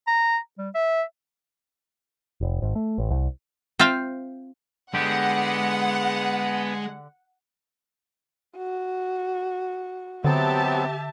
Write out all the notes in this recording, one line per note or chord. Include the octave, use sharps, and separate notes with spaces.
A#5
G3
E5
F1
G#1
A3
A1
C2
C4 F4 E5 F5 G5
D3 G#3 B3 G4 F#5
F#4
D3 F#3 B3 C4 G4 E5 A5